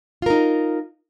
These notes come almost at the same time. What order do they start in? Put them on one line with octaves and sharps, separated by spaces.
F4 A#4 D#4